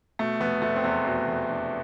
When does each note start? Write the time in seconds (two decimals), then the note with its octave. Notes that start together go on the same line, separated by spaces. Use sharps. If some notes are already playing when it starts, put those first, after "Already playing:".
0.19 B2 A3
0.40 F1 B3
0.62 F1 A3
0.76 C4
0.84 E2 B3
1.05 B2 C4
1.28 F1
1.49 F1 D4